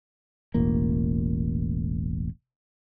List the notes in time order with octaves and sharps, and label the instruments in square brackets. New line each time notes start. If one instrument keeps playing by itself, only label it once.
[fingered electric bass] E1 A1 A#3